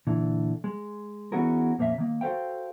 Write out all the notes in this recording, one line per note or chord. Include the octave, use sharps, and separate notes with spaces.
A#2 D3 E3
G#3
E3 B3 C#4 F#4 G#4 A#4
F2 A#2 A#3 C#4 E5
D#3 A#3
F#4 A4 C5 F5 G5